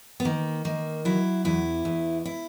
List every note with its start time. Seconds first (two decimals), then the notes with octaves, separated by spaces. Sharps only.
0.20 B3
0.25 D#3 A#3
0.65 D#3 A#3
1.05 F#3 E4
1.45 E2 E4
1.85 E2
2.25 E4